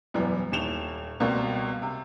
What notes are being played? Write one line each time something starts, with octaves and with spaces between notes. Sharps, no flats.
E1 F#2 E3 G3 B3
D#1 D#2 E7 F7
C#2 B2 G3 A#3 C4
C3